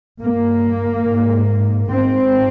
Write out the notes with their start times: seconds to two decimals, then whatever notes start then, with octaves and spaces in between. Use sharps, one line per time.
0.20 G2 A#3
1.06 G#2
1.91 G#2 C4